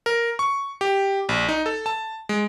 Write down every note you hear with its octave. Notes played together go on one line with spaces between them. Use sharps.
A#4
C#6
G4
A#1
D#4
A4
A5
G#3